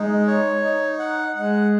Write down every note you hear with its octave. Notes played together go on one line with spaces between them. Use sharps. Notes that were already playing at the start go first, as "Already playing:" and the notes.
Already playing: G#3 D#4
C#5
D#4
F#5
G#3 F#5